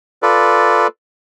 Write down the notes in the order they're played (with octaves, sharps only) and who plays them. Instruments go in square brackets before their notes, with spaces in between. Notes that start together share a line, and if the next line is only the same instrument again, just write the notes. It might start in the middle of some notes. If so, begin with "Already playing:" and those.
[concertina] F4 A4 B4 D5